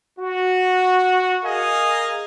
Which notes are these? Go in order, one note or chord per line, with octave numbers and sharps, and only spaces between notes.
F#4
G#4 A#4 D#5 F5 G#5